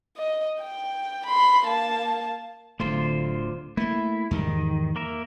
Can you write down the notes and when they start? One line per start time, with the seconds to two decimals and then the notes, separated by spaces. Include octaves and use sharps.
0.17 D#5
0.61 G5
1.26 B5 C6
1.66 A#3 A5
2.80 D1 D2 D3 A3 F4 C5
3.77 A3 A#3 E4
4.31 E2 G#2 D#3 G3
4.96 A#3 A#4 E5